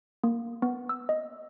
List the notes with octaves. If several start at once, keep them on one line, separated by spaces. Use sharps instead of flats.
A#3
B3
E6
D#5